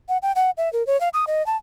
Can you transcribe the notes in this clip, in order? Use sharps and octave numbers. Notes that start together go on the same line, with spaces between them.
F#5
G5
F#5
E5
A#4
C#5
F5
D#6
D#5
A5